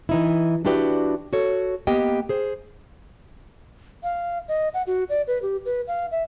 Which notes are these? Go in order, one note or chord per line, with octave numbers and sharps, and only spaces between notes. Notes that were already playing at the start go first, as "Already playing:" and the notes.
E3 D#4 E4
D4 E4 F#4 G4 B4 D5
F#4 A4 C#5
A#3 B3 G4 D#5 G5
G#4 C5
F5
D#5
F#5
F#4
D5
B4
G4
B4
F5
E5